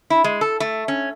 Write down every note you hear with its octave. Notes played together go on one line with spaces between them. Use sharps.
E4
G#3
A4
A3
C#4